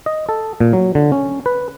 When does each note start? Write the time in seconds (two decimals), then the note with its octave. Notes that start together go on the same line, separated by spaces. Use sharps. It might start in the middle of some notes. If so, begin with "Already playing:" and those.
0.06 D#5
0.29 A4
0.60 A#2
0.73 F#3
0.95 D3
1.12 C#4
1.46 B4